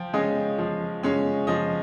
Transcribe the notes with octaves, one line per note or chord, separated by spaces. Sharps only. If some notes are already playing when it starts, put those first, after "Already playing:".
Already playing: F3 G5
G#3 C#4 D#5
F3
G#3 C#4
F3 D#5